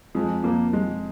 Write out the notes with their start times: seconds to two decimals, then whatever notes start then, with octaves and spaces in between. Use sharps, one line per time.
0.15 F2 G#3
0.43 F2 A#3
0.73 G#3